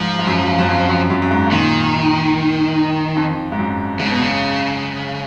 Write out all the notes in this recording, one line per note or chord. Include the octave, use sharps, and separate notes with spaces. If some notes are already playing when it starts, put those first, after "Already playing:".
Already playing: G#2 F3
G#2
F#2
F#2
F2
F#2
F#2
F#2
G#2
G#2
A#2 D#3
F2
G#2
F#2
G#2 C#3
B2
C#3